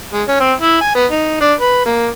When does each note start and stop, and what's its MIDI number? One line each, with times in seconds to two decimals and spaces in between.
0.13 0.23 56
0.28 0.36 61
0.40 0.52 60
0.60 0.77 64
0.81 0.92 80
0.95 1.05 59
1.11 1.36 63
1.41 1.53 62
1.60 1.83 71
1.86 2.08 58